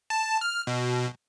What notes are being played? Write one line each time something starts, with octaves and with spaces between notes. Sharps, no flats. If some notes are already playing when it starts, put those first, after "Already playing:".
A5
F6
B2